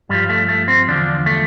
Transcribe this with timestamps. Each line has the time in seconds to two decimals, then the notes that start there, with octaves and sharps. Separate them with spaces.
0.09 G2 F3 G3
0.29 A3
0.49 A3
0.68 C4
0.88 E2 D3 F3 D4
1.26 A3